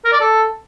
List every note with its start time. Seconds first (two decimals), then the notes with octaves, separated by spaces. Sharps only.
0.05 A#4
0.13 D5
0.20 A4